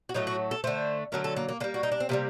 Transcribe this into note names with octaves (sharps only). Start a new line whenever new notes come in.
F#4
A2 F#3 A3 D#4
F#4
A4
D3 A3 C5
D3 F#3 A3 A#4
A4
A#3
A#3
D3 G3 A#3
F#4
D#4
D4
C4
C3 D#3 G3 A#3